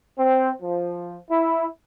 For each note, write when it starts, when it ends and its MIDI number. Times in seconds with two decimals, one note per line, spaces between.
0.17 0.50 60
0.61 1.16 53
1.29 1.64 64